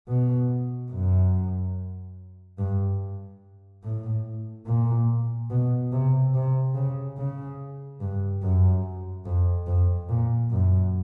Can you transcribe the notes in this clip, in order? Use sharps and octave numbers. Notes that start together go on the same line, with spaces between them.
B2
F#2
G2
A2
A#2
B2
C3
C3
C#3
C#3
G2
F#2
F2
F2
A#2
F#2